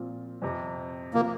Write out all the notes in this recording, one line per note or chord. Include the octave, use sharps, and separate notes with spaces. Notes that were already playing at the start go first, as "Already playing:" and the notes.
Already playing: A#2 F3 C4 F4
F2 C3 F3
C3 F3 A#3